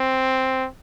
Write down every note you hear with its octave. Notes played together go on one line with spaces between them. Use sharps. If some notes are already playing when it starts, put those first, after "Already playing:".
Already playing: C4